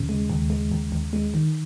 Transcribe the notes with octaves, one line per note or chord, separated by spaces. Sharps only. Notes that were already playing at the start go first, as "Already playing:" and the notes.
Already playing: D#2 C#3
G#3
D#2
G#3
D#2
D#2
G#3
D#3